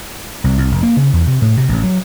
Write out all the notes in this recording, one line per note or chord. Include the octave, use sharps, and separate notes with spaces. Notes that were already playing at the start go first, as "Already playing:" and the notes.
C2
C2
F1
A#3
C#3
E2
C3
A2
C3
A1
F#3